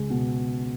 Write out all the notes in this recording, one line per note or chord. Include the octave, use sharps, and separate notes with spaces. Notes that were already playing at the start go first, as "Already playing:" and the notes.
Already playing: C#2 G#3
B2